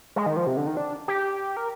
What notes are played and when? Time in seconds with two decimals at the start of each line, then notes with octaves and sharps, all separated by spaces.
0.16 G#3
0.26 D#3
0.37 F3
0.47 C3
0.57 D3
0.67 D#3
0.77 D4
1.08 G4
1.57 A#4